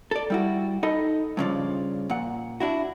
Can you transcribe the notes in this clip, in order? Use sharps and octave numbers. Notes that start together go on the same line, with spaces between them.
A4 D5
G3 E4 F#4
D#4 A4 D#5 B5
G2 C#3 F3 D5
A#2 F#5
D4 E4 F#4